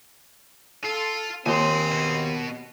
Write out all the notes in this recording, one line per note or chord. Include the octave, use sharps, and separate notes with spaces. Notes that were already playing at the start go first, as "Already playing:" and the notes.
F4 A4
D#2 C4 G#5 C6
B2